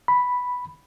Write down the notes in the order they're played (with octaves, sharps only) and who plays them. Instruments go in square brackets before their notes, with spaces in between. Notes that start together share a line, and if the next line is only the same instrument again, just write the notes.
[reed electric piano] B5